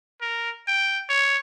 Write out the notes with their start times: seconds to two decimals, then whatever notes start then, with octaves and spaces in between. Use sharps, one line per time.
0.21 A#4
0.68 G5
1.09 C#5